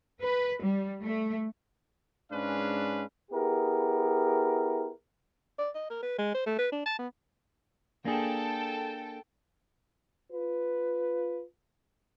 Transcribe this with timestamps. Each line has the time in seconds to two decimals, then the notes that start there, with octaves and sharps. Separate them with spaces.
0.21 B4
0.62 G3
1.03 A3
2.31 G#2 G#3 C#4 D4 B4 F5
3.32 B3 E4 G4 G#4 A#4
5.59 D5
5.75 D#5
5.90 A#4
6.03 B4
6.18 G#3
6.34 C5
6.46 A3
6.59 B4
6.72 D4
6.86 A5
6.99 B3
8.05 A#3 D4 G#4 A4 G5
10.30 F4 B4